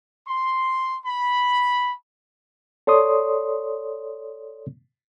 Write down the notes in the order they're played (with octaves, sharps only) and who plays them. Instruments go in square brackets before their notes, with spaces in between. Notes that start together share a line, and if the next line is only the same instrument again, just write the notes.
[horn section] C6
B5
[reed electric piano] A4 C#5 D5 C6 D#6